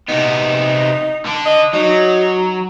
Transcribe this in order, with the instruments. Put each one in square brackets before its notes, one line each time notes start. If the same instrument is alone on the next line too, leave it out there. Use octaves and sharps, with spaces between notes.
[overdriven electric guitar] C3 B3 [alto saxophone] D#4
[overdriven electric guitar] D3
[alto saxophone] D#5
[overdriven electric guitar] F#3 [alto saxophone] D#4